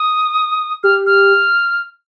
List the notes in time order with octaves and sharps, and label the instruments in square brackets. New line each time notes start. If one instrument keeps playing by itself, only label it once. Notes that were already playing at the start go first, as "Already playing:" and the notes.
Already playing: [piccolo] D#6
[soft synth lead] G4 [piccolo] F6
[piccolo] F6